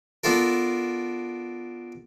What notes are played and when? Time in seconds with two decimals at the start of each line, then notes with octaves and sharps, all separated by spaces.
0.24 B3 D4 F4 A4 A#4